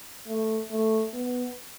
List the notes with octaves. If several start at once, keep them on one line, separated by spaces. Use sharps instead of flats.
A3
A3
B3